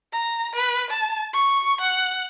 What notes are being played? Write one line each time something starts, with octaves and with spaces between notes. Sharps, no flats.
A#5
B4
A5
C#6
F#5